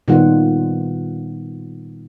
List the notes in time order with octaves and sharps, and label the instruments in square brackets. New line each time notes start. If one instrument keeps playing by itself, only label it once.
[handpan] A#2 D#3 G3 B3 F4 F#5